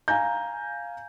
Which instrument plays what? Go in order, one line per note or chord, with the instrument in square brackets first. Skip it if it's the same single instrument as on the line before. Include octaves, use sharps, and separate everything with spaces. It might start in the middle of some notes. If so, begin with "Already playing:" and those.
[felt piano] F5 G#5 A#5 G6